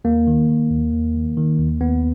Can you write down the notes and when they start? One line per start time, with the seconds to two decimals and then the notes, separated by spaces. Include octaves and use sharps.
0.04 D#2 A#3
0.27 D#3
0.49 D#3
0.71 D#2
0.93 D#2
1.15 D#3
1.37 D#3
1.59 D#2
1.80 D#2 B3